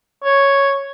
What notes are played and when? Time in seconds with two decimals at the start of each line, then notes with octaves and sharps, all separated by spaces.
0.24 C#5